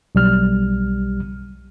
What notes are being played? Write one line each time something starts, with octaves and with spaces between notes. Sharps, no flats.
B1 G3 F6